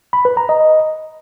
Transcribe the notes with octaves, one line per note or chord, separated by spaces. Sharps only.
B5
B4
A#5
D#5